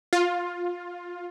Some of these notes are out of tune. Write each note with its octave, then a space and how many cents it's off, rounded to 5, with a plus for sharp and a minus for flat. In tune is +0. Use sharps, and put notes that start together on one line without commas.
F4 +15